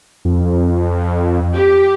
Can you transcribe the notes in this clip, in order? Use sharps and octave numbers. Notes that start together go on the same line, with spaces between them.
F2
G4